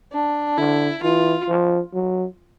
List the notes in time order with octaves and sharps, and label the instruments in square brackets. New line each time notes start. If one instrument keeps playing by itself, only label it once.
[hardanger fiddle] D4
[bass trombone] D3 [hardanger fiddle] E4
[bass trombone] E3 [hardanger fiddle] F4
[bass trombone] F3
F#3